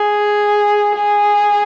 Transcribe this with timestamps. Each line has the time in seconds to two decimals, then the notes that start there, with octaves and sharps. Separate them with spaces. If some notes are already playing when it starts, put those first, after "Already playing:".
Already playing: G#4
0.95 G#4